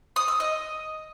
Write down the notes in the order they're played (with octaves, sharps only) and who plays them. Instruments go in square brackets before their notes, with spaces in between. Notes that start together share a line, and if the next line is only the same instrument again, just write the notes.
[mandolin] D#6
E6
D#5